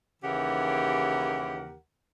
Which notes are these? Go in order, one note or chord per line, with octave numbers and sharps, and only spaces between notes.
D#2 C#3 E3 G4 A#4 F#5